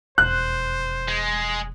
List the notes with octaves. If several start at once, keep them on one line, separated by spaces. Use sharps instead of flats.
E1 F2 C5 F#6
G#3